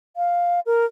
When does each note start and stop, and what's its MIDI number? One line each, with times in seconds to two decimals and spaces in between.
0.17 0.60 77
0.66 0.86 70